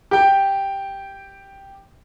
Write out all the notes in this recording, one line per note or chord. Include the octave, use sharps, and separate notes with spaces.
G4 G5